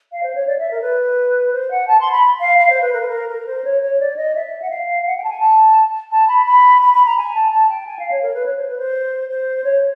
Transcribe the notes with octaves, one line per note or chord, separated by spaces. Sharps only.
F5
C5
C#5
D5
E5
A#4
B4
C5
F#5
A5
C6
B5
F5
F5
C5
B4
A#4
B4
A#4
A#4
C5
C#5
C#5
D5
D#5
E5
F#5
F5
F#5
G5
A5
G#5
A5
A5
B5
B5
B5
B5
A#5
G#5
A5
A5
G5
G#5
F5
C#5
A#4
B4
C#5
C5
B4
C5
C5
C#5